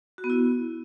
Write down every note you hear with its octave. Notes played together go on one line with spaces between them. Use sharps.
F#4
B3
E4